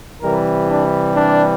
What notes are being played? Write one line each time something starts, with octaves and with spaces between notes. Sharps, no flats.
C3 E3 G3 A#4
D4
D4